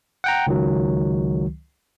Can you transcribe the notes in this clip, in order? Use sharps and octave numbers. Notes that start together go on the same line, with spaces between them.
F#5 G5 A#5
C#2 D#3 F#3